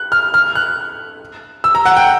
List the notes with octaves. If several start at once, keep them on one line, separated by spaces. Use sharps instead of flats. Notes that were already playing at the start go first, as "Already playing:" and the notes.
Already playing: F#6
F6
F6
F#6
E6
A#5
F#5
G5